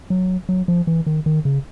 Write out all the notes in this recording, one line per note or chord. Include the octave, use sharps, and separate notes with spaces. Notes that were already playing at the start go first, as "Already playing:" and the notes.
F#3
F#3
F3
E3
D#3
D#3
C#3